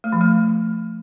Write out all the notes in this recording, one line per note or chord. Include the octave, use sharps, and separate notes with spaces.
A3
F3
A3